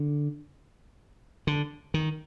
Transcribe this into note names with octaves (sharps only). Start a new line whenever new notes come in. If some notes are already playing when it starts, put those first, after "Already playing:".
Already playing: D3
D3
D#3